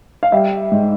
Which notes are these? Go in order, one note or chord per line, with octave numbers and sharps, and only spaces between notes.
F5
G3 E5
G#2